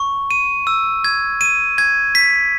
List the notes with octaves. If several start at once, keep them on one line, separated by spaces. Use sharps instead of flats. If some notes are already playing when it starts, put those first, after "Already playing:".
Already playing: C#6
D#7
E6
G#6
D#7
G#6
B6